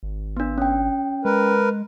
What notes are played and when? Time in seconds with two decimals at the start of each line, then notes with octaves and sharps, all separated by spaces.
0.03 G#1
0.37 B3 D4
0.58 C#4 G5
1.25 G#3 A#4 B4